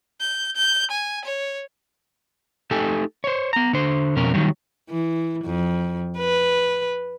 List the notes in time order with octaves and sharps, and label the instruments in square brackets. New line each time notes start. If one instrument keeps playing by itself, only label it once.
[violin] G6
G6
G#5
C#5
[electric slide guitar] A3 D#4 G4 A4 G#5
C5 C#5
B3 A#5
D3 C5
F2 B2 C#4 A#4
D#3 F#3 G3
[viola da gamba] E3
F2
B4